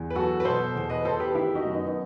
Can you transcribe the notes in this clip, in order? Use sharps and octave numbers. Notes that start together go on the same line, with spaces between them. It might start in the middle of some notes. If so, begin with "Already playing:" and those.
Already playing: E2
B4
F#3 F#4 A4
B4
B2 A4 C5
E2
B4 D#5
E2 A4 C5
G4 B4
D#3 E4 G4
D#4 F#4
F#2
B3 D#4
D#4